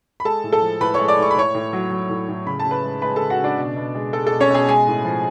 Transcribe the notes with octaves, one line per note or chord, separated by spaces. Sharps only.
B5
G#3 A4 A5
A2
A4 A5
F3
A2 B4 B5
C#5 C#6
G#3
D5 D6
A2 C#6
B5
A2 C#5 C#6
A2
F#3
F#3
A2
A2
C#3 B5
A5
C#3
B4 B5
G#3
G#3 B4 B5
C#3 A4 A5
F#4 F#5
C#3
D4 D5
B2
B2
G#3
G#3 A4
A4
B2
C#4 C#5
B2 G#4 G#5
G#3 G#4 G#5
A2
F3